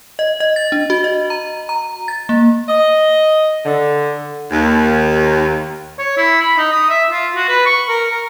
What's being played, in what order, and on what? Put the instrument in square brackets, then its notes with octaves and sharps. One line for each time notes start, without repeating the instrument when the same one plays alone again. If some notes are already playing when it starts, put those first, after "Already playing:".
[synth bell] D#5
D#5
A6
D4
F#4
D#5
A#5
A#5
A6
A#3
[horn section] D#5
D3
[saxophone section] D#2
[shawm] C#5
E4
B5
D#4
D#6
E5
F4
F#4
B4
C#6
A#4
A#4